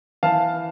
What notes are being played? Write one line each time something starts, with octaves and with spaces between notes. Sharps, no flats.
E3 F5 A5